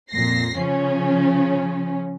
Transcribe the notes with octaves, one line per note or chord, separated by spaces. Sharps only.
F2 A#2 A#6 C7
C#3 F3 C#4